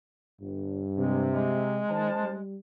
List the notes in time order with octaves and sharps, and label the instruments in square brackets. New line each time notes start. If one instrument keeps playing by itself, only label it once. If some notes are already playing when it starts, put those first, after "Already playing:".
[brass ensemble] G1 [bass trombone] G2
[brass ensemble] C3 [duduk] G#3
[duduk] G#3
[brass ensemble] F#1 C5 A5 [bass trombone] D#3
[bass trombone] G3